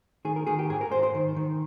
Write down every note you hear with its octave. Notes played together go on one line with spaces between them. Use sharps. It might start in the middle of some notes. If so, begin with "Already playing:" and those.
D#3 G#4
A#4
D#3 G#4
G4
G#2 G#4
A#4
G#2 C5
C5
D#3
D#3